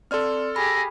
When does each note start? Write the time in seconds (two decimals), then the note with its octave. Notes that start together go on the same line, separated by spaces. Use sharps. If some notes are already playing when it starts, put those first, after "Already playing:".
0.11 C4 A4 D5 C6 F6
0.56 G4 G#4 B5 A#6